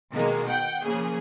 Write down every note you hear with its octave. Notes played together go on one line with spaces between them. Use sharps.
B2 D#3 G#3 A#3
F#5 G5
C#3 F3 A#3 G#4